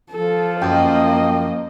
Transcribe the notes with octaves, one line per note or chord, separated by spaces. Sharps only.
F3 A4
F#2 A#3 D#5 G5